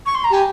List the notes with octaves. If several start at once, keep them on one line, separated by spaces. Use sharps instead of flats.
C#6
C6
A#5
G4 G#5